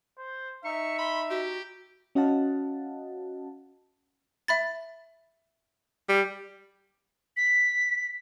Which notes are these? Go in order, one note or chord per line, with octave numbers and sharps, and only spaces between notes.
C5
D#4 E5 C#6
B5 C6
F#4 G4
C#4 F#4 D#5 F5 F#5 A5
E5 B5 A6
G3
B6